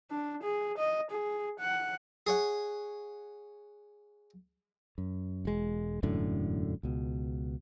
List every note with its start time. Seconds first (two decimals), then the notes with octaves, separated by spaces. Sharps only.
0.11 D4
0.42 G#4
0.77 D#5
1.10 G#4
1.59 F#5
2.27 G#4 C#5 F#5
4.98 F#2
5.45 E1 G#3
6.03 E1 F#2 A2 D3
6.83 C#2 B2